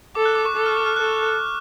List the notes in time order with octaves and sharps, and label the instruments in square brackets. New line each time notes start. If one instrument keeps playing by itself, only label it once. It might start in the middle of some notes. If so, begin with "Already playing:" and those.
[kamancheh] A4 [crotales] D6
[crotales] F#6
D6
C#6
[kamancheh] A4 [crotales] D6
[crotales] F6
D6
F6
[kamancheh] A4 [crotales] F#6